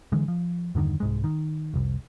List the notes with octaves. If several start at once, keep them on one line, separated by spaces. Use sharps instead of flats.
D3 E3 G#3
F3
E2 G2 D3 D#3
C2 G#2 G#3
D#3
F1 C2